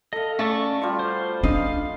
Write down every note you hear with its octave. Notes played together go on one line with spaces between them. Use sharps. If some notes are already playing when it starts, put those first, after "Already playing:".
A4 D#5 F5
A3 C#4 D5 C#6
G3 F4 F#4
C5
D4 D#5 F5